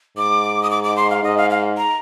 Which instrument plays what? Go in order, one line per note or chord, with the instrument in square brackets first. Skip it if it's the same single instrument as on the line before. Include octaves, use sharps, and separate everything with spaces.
[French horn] G#2 [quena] D6
[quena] D#6
D6
D6
C6
F5
[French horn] G#2 [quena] D#5
[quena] F5
F5
A#5